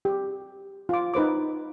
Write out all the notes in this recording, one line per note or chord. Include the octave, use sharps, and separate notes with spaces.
G4
F4 D6
D#4 B4 C5 D6